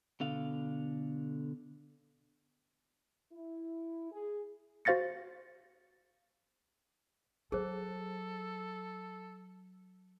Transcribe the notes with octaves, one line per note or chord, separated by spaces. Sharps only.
B2 D3 F5
E4
G#4
F#4 C5 F5 A6 A#6 C#7
F#3 G#4 A4 C5